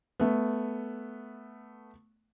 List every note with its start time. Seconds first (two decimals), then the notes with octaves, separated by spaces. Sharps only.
0.20 A3 B3